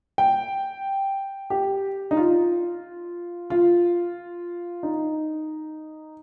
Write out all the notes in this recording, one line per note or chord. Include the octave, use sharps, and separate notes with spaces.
G5
G4
D#4
F4
F4
D#4